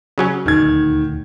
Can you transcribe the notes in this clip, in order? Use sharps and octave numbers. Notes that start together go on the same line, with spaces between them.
C#3 F#3 C#4
D#1 D2 D#3 G#6